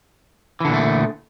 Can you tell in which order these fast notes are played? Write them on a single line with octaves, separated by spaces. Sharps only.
E3 D3 A#2 A3